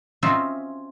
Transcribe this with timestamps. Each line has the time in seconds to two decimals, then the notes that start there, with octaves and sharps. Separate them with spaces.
0.23 C4 C#4 D#4 F4 F#4 E5